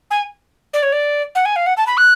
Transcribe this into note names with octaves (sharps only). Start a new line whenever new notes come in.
G#5
D5
C#5
D5
F#5
G#5
F5
F#5
A5
B5
F#6